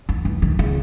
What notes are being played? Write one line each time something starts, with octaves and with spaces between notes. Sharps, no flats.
D#3
E3
D#3
C#3